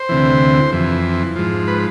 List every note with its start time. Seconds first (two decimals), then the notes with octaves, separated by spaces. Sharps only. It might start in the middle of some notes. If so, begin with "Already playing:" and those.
Already playing: C5
0.09 D2 C3 E3
0.72 F2 E3
1.36 G#2 F3
1.68 B4